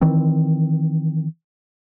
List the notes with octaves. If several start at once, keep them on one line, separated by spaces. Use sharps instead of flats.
D#3 E3 C4